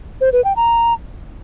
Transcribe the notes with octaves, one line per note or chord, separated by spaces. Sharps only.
C5
B4
G5
A#5